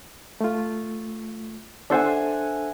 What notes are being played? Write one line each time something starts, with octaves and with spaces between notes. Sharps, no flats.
A3 F4
D4 A4 C5 E5 F#5 G#5